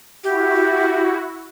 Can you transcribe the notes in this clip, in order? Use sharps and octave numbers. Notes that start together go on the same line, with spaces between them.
E4 F#4 G4